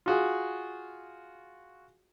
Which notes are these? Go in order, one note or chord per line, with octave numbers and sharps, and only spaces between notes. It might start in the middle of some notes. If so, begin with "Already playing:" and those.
F4 F#4 G#4